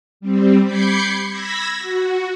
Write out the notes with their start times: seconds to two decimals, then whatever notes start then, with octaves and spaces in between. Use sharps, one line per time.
0.20 G3 C4
0.63 B5 D6 G6 G#6 C7 C#7
1.29 B5 E6 G#6 A#6 B6
1.78 F#4